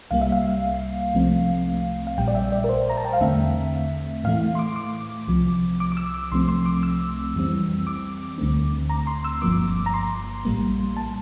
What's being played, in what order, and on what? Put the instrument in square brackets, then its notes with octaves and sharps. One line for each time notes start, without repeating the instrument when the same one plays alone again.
[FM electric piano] C2 C3 G3 A#3 F5
E5
F5
C2 C3 F3 A3 C4
F5
A#1 A#2 G3 G5
D5
E5
D5
A#4
C5
A#5
A5
G5
F5
E2 D3 A3 C4 E5
A2 E3 A3 F5
C6
D6
D6
C2 C3 F3
D6
D6
E6
D6
C2 C3 F3 A3 C4 C6
C6
D6
E6
F2 E3 G3 C4
D6
D2 D3 A3 C4
A#5
C6
E6
G1 G2 F3 A#3 D6
A#5
C6
A#1 A2 G3 A#3
A5